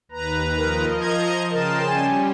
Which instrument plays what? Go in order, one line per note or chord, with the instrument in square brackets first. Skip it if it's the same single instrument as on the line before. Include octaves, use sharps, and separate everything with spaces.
[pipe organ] D#2 B4 A#5
[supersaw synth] F3 D#5 [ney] A#4
[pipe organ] A#5 G#6
[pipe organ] C#3 A5 [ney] A#4 [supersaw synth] G5 C6
[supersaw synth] G3 C#4 [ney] G#5